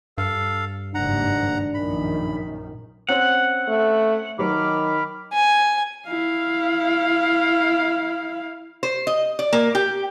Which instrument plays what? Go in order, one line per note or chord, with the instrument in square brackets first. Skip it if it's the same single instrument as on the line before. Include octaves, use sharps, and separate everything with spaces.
[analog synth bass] G2 [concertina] A4 F5
[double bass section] F#1 D#2 G#2 [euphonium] D4 [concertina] F#5 A#5
[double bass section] A#1 F#2 D#3 [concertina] B5
[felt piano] C4 C#4 [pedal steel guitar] F#5
[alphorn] A3
[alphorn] D#3 [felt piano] F#3 [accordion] B5 D6 F6
[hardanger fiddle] G#5
[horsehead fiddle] E4 F5
[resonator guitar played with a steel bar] C5
D#5
D5
A#3
G4